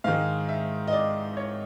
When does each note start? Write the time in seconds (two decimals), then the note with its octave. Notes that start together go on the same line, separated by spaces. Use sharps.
0.04 G#2 D#3 G#3 F5
0.49 E5
0.88 D#5
0.93 D5
1.37 C#5